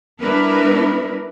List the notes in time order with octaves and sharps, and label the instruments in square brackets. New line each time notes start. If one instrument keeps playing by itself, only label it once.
[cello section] G3 B3 D4 E4 A#4 B4